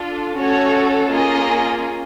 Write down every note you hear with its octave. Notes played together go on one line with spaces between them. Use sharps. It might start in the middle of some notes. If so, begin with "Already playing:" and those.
Already playing: D4 F4 A4
A3 C#4 F#4 A4 C#5
A#3 C#4 F4 G#4 D#5